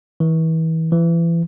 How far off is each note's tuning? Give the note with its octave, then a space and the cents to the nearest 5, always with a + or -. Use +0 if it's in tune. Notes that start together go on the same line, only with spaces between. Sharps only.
E3 -35
E3 +30